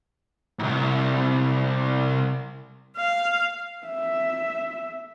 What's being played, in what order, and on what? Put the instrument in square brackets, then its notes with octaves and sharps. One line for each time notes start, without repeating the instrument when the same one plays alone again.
[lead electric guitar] C2 G#2
[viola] F5
[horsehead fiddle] E5